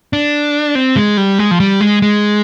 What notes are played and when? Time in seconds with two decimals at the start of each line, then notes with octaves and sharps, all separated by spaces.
0.13 D4
0.75 C4
0.97 G#3
1.17 G3
1.39 G#3
1.51 F3
1.60 G3
1.81 G#3
2.02 G#3